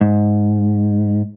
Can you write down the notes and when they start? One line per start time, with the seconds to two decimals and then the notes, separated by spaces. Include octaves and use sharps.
0.01 G#2